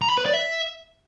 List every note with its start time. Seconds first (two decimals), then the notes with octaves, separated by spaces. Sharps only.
0.02 A#5
0.10 B5
0.18 B4
0.26 D5
0.34 E5